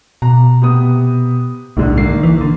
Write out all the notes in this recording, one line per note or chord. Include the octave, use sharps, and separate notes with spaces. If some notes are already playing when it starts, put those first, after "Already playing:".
B2 A#5
C3 B3 D#6
D1 B1 G#2 D3
D#3 A#3 C7
E3
D3